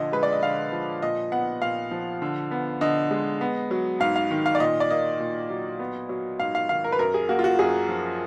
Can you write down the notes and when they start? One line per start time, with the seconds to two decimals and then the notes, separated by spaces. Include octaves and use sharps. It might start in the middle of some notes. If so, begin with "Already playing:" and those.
Already playing: A#2 D3 F3 D#5
0.12 G#3 B4
0.23 D5
0.32 D#5
0.42 D3 F5
0.72 F3
1.02 A#2 D#5
1.32 B3 F#5
1.62 A#2 F5
1.91 F3
2.22 D3
2.51 B3
2.81 D3 D#5
3.11 G#3
3.41 B3
3.71 F#3
4.00 G#2 F5
4.16 F5
4.31 D#3
4.46 F5
4.55 D5
4.60 A#2 D#5
4.80 D5
4.90 A#3 D#5
5.20 A#2
5.50 F#3
5.79 B3
6.09 F#3
6.39 G#2 F5
6.55 F5
6.69 D#3 F5
6.84 A#4
6.92 B4
6.99 F#2 A#4
7.14 G#4
7.29 A#3 F#4
7.39 F4
7.44 F#4
7.59 F#2 G#4
7.89 F3